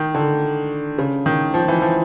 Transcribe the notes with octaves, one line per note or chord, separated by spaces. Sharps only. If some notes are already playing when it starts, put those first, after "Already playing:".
Already playing: D#3
D3
C#3
D#3
F3
E3
F3